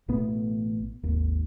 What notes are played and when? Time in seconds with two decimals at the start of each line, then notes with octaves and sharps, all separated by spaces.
0.08 A1 B2 A3 B3
1.03 G#1 D#2